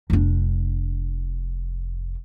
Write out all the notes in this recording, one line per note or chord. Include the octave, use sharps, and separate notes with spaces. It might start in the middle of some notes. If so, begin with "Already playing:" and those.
F1 D4